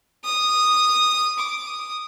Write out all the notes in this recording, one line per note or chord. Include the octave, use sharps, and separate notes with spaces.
D#6
D6
D#6